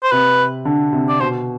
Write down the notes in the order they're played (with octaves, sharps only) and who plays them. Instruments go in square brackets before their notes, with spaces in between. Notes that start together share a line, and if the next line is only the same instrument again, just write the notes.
[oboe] C5
[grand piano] C3 [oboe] B4
[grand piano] D3
C3
[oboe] D5
[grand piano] B2 [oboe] C5